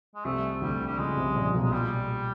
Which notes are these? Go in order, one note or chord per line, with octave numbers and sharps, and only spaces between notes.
G#3
C2 C3 A3
D2 D3 G3
G3
C#2 C#3 G#3
C2 C3
A#1 A#2
B1 B2
G#3
A#2 G3